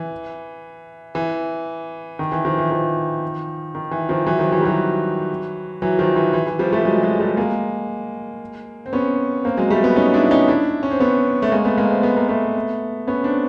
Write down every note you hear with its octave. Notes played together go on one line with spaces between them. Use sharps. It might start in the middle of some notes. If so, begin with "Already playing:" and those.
Already playing: E3
E3
D#3
E3
D#3 F3
E3
D#3 F3
D#3
E3
D#3 F3
E3 F#3
D#3 F3
E3 F#3
G3
E3 F#3
E3 F#3
D#3 F3
E3
E3
E3
F3 G3
G3 A3
F#3 G#3
F#3 G#3
G3 A3
G#3 A#3
C4
B3 C#4
A#3 C4
F#3 G#3
G3 A3
A3 B3
C#4 D#4
D4 E4
E4
C#4 D#4
D4 E4
C#4
C4
B3 C#4
A3
G#3 A#3
A3 B3
G#3 A#3
C4
B3
A#3
A3 B3
B3 C#4
C4 D4